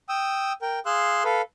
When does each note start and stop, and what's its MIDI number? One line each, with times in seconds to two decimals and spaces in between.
0.09 0.53 79
0.09 0.53 87
0.09 0.53 88
0.62 0.79 70
0.62 0.79 79
0.86 1.23 68
0.86 1.23 77
0.86 1.23 84
0.86 1.23 88
0.86 1.23 90
1.24 1.42 69
1.24 1.42 71
1.24 1.42 77